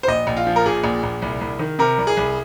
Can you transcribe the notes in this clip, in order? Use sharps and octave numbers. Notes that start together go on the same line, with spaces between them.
C5
A#1 D#5
A#1
F4
F3
A#4
A#2 G#4
A#1
A#1
C2
C2
D#3
C3 A#4
C2
G#4
C2